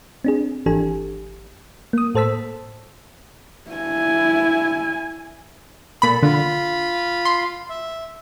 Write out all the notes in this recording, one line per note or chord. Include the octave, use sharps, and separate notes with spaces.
C4 D4 G#4
G#1 E3 D4 G4 A4 G#5
A#3 D#6
A2 A4 C5 A5 E6 B6
E4 G#5
A#2 A4 B5
D3 F4 B5
C6
E5